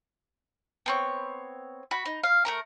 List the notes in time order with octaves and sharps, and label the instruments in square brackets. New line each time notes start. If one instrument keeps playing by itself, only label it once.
[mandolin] B3 C4 C#5
F#4 B5
D#4
F5
A3 A#4 A#5